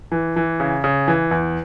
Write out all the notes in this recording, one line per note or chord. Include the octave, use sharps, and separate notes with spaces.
E3
E3
C#3
C#3
E3
E2